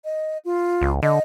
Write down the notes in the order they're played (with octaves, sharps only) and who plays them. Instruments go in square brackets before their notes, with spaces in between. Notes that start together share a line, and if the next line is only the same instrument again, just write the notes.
[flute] D#5
F4
[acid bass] C#2
[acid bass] D3 [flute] D#5